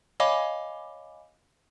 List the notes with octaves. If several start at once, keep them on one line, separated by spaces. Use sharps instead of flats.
C#5 D#5 F5 G#5 B5 D6